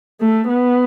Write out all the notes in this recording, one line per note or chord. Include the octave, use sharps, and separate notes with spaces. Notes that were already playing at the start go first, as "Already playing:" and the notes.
A3
B3